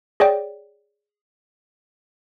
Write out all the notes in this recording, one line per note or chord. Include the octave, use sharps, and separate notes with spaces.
G#4 C#5 D5 G5